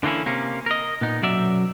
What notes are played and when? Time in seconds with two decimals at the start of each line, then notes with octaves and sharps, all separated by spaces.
0.03 D3 E3 A#3 C#4 E4
0.26 C3 A#3 C#4
0.66 A#4 D#5
1.01 A#2 B3 D#4
1.22 B1 F#2 F#3 D5 E5